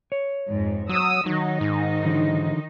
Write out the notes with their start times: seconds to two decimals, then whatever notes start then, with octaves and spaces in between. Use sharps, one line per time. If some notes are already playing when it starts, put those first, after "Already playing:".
0.12 C#5
0.48 F2 G#2
0.89 F#3 D#6 E6
1.26 D#3 F#3 D#4
1.61 G#2
2.03 D3 E3 F#3